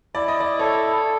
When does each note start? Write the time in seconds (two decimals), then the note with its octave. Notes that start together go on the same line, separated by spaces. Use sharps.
0.15 E4 D5
0.28 D#5
0.40 D5
0.59 A4 C#5